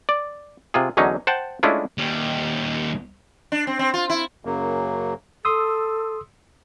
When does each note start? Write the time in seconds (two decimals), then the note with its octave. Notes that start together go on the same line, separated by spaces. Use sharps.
0.09 D5
0.74 C3 F4 G#4
0.97 E2 D3 F#3 C#4 D#4
1.27 C5 F#5 G5 A5
1.63 G#3 A3 C#4 D4 E4 F4
1.98 D#2 G3
3.52 D4
3.67 C4
3.79 C4
3.94 F4
4.10 E4
4.45 F#2 C#3 F#3 A#3
5.45 A4 C6 D#6 E6